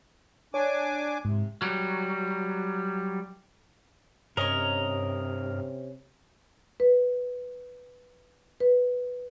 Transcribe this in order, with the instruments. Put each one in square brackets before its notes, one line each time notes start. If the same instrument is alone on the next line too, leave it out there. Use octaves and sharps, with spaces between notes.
[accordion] D4 G#5 D6 [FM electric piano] C#5
[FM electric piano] G#2 [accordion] C3
[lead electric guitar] F#3 G3
[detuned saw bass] G2 [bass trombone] C3 [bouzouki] C#4 C#5 [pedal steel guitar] A#4 D#5
[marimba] B4
B4